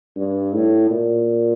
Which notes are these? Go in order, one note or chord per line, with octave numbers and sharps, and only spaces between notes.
G2
A2
A#2